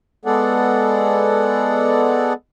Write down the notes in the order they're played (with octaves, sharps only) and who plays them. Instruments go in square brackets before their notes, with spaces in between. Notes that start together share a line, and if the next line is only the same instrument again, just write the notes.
[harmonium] G#3 B3 G#4 A4 D5 F#5